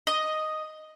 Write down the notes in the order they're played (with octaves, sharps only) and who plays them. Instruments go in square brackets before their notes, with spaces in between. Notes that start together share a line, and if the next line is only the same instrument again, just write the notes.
[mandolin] D#5